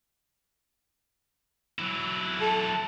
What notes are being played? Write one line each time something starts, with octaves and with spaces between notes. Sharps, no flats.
F#3 E4
A4